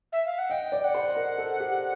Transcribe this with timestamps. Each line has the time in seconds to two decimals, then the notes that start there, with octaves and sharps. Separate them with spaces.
0.12 E5
0.25 F5
0.38 F#5
0.50 D#5 G5
0.72 D5
0.83 F#5
0.95 C5
1.16 A#4
1.38 A4
1.60 G4